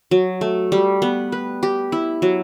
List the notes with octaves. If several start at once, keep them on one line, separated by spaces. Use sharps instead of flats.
F#3
A3
G3
B3
B4
G4
E4
F#3